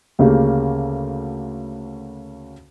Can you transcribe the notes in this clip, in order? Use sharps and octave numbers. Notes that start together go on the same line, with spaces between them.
D2 C#3 A#3 G4